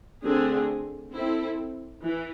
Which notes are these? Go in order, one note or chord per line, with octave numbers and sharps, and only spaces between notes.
D3 A3 C4 G#4
C4 E4 A4
E3